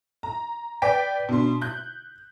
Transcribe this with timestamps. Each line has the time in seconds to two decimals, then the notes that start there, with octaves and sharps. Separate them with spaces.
0.23 A#5
0.82 B4 D5 G5 B6 D7
1.29 B2 D4 C6
1.61 F#6 G6